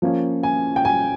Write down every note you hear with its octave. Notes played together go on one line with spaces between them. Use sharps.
F3 A#3 C#4
G#5
G5
G#5